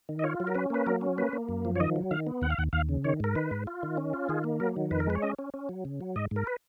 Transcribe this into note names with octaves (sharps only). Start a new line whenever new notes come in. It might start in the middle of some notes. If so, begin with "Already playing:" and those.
D#3
D#5
F4 C#5
F#3
A#4
C#4 B4
A#3 B4
F#3 A#4
C#4
A#3 B4
A#3
F#2
F3
C#5
D#3 D#5
F#3
D#3 F5
B3
D#2 F#5
F5
D#2 F#5
D#2 F5
C#3
D#3 C#5
G#2 A#4
D#3 B4
G#2
F4
D#3
C#4
F4
D#3 G#4
A#3
F#3 A#4
D#3
F2 B4
A#4
G#3 B4
C#5
C#4 D#5
C#4
C#4
F#3
C#3
F#3
G#2 D#5
G#2 A#4
B4